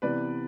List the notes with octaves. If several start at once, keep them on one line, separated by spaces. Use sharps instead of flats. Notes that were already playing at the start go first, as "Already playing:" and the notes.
C3 E3 B3 B4 D5